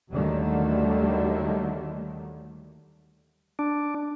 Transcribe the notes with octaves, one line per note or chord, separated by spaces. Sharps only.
D#2 D3 D#3 F#3 G3 A3
D4